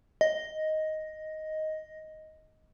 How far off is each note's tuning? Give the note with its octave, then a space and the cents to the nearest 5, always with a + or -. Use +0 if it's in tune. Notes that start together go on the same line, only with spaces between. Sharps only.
D#5 +5